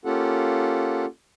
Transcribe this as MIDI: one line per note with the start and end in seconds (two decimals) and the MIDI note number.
0.05 1.05 58
0.05 1.05 61
0.05 1.05 65
0.05 1.05 67
0.05 1.05 69
0.05 1.05 78